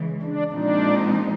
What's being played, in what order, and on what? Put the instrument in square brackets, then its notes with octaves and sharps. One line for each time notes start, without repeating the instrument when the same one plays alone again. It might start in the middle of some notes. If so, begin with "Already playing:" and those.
Already playing: [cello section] C#3 E3 G#3
[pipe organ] D4
[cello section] A#2 F3 G#3 C4 D#4 [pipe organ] D4